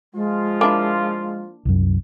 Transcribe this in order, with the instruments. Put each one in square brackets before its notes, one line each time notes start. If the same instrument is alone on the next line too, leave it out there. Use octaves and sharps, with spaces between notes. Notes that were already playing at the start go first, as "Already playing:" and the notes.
[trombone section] F3 F4 [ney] G#3
[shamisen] A#3 D4 E4
[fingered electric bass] C2 F#2